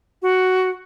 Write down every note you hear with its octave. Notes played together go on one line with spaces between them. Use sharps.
F#4